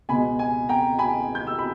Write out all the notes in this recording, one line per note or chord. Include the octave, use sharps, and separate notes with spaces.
C#2 B2 G#3 G#5 B5
G#5
G5 A#5
G#5 B5
G6
E6
B5